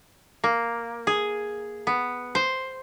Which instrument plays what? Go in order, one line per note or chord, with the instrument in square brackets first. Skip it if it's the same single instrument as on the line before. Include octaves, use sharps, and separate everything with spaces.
[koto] A#3
G#4
B3
C5